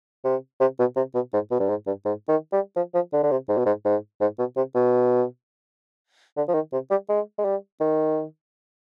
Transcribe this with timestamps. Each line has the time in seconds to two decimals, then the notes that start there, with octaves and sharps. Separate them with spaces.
0.25 C3
0.60 C3
0.79 B2
0.96 C3
1.15 B2
1.33 G#2
1.51 B2
1.60 G2
1.69 G#2
1.87 G2
2.05 G#2
2.29 D#3
2.52 G3
2.76 F3
2.94 F3
3.13 D3
3.23 D3
3.31 C3
3.49 G#2
3.57 B2
3.66 G#2
3.85 G#2
4.21 G#2
4.39 B2
4.56 C3
4.75 B2
6.37 D3
6.48 F3
6.54 D#3
6.73 C3
6.91 G3
7.09 G#3
7.38 G#3
7.45 G3
7.81 D#3